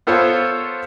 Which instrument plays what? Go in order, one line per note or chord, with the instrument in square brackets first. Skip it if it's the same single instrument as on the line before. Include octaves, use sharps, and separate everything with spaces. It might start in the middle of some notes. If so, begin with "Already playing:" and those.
[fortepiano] B3 F4 A4 C5 C#5